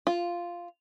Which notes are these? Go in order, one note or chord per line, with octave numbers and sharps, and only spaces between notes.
F4